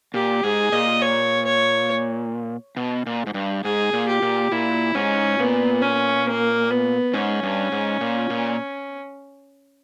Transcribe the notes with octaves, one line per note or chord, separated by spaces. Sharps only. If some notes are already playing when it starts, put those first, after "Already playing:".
A#2 G4
G#2 G#4
A#2 D#5
C#5
C#5
B2
A#2
G#2
G2
G#2 G#4
A#2
G4
A#2
A#2 E4
G#2 C#4
A#2 B3
C#4
A#3
B3
G#2 C#4
G2
G#2
A#2
A#2